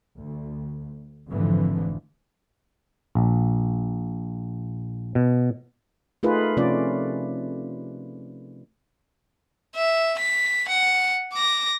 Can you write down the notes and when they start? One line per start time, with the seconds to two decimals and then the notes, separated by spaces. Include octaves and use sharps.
0.15 D2
1.29 F1 F2 G#2 D3 E3 F3
3.15 A#1
5.15 B2
6.23 A3 D#4 F4 G#4 A#4 B4
6.57 C3 F3 A3 C#4 F4 D5
9.76 E5
10.20 B6
10.69 F#5
11.33 D6 A#6